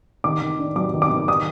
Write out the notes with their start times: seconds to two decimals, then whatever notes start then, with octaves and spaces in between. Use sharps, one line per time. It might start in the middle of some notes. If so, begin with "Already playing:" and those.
0.24 D#3 D6
0.41 D#3
0.59 D4
0.76 F#3 D6
0.93 D#3
1.02 D6
1.11 D#3
1.28 D#3 D#6